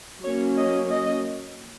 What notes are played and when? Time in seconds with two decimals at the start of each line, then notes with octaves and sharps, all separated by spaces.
0.22 F#3 A#3 C#4 C#5
0.56 D#5
0.90 D#5